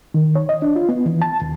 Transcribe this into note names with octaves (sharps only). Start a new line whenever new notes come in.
D#3
C#5
D#5
D4
F4
B3
E3
A5
D#2